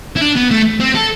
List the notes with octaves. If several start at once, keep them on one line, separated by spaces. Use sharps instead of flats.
E4
D4
B3
A3
C4
A4